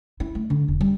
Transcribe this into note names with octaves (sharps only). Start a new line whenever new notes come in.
E4
A3
D3
E1
G3